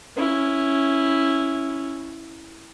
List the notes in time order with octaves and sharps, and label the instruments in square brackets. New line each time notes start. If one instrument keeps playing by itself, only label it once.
[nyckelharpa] C#4 E4